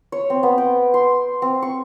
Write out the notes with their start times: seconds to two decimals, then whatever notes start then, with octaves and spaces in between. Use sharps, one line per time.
0.12 C#5
0.30 C4
0.43 B3
0.58 G5
0.94 C6
1.42 C4
1.62 C#6